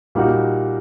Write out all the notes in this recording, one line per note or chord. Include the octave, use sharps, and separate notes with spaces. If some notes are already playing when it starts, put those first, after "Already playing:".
A#2 G3 A#3 D#4 F#4